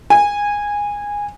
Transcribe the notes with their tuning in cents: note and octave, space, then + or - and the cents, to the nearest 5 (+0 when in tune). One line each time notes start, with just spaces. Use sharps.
G#5 -15